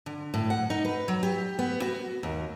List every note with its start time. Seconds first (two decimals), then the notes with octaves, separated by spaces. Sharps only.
0.06 D3
0.34 A2
0.50 F#5
0.70 D#4
0.85 B4
1.08 F#3
1.23 G4
1.59 B3
1.82 F#4
2.23 D#2